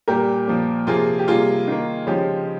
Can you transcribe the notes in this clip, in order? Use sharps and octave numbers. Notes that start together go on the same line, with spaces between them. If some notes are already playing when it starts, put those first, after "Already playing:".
A#2 G3 A#3 G4 A#4
A#2 F3 A#3
C3 F3 A#3 F4 G#4
G4
C3 G3 A#3 F4 G#4
D#3 A#3
C#3 F3 G#3 G4